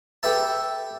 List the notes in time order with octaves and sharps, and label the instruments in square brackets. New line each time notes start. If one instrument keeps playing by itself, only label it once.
[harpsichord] G4 A4 B4 E5 A5